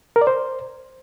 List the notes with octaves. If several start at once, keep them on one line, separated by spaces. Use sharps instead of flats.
A#4
D5
C5